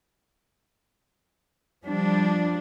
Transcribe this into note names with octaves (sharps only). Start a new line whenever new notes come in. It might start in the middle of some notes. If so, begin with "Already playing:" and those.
F3 G3 D4